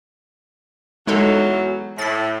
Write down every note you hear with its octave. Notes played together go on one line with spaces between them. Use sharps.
E2 F#3 G#3 D#4 A4
A2 A6 B6